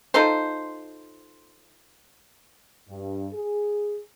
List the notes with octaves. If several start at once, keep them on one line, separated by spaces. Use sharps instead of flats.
D#4 F4 A4 C5
G2
G#4